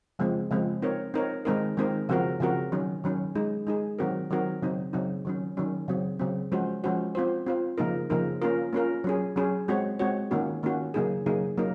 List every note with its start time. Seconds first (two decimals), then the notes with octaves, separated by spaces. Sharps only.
0.19 C#3 F3 G#3 C4
0.51 C#3 F3 G#3 C4
0.82 C4 D#4 A#4 C#5
1.14 C4 D#4 A#4 C#5
1.45 D#3 G#3 C4 D#4 A#4
1.77 D#3 G#3 C4 D#4 A#4
2.09 C#3 F3 C4 F#4 A#4
2.40 C#3 F3 C4 F#4 A#4
2.72 D#3 F#3 C#4
3.04 D#3 F#3 C#4
3.35 G#3 D#4 G#4
3.67 G#3 D#4 G#4
3.99 D#3 F#3 C4 F#4 A#4
4.31 D#3 F#3 C4 F#4 A#4
4.62 C#3 F#3 C4 D#4
4.93 C#3 F#3 C4 D#4
5.25 D#3 F#3 C#4
5.57 D#3 F#3 C#4
5.88 C#3 F#3 C4
6.19 C#3 F#3 C4
6.52 F3 G#3 C#4 F#4 C5
6.84 F3 G#3 C#4 F#4 C5
7.15 C4 F4 C5
7.46 C4 F4 C5
7.78 C#3 F3 A#3 D#4 A#4
8.10 C#3 F3 A#3 D#4 A#4
8.42 A#3 C#4 F4 A#4
8.73 A#3 C#4 F4 A#4
9.04 F#3 C#4 G#4
9.36 F#3 C#4 G#4
9.68 G#3 C4 F#4 C#5
9.99 G#3 C4 F#4 C#5
10.31 D#3 A#3 C#4 F#4
10.63 D#3 A#3 C#4 F#4
10.94 C#3 F#3 A#3 D#4 G#4
11.26 C#3 F#3 A#3 D#4 G#4
11.57 F#3 A#3 D#4 A#4